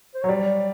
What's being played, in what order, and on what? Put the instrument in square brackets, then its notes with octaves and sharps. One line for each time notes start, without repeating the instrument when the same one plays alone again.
[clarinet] C5
[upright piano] F#3 [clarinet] C#5
[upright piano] G3 [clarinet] D5